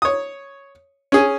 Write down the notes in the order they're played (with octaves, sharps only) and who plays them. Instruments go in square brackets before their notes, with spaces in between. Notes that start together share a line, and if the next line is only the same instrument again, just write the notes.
[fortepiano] C#5 D#6
C#4 G#4